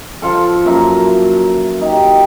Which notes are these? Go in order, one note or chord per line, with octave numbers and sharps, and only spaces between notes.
F3 F4 A4
F#2 A#3 E5 A#5
D#4 G4